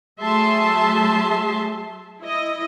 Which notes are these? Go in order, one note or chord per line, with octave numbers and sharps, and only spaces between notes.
F#3 A3 G#4 E5 A5 C6
E4 D#5